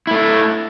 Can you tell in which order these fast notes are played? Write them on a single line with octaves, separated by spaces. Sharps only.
E4 A3 D4